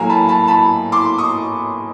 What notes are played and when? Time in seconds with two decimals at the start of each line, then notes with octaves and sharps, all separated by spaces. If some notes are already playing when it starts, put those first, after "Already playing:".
Already playing: A2 F#3 A#3 G#5 A#5
0.10 A5 B5
0.29 A5 B5
0.48 A5 B5
0.92 C6 D6
1.18 C#6 D#6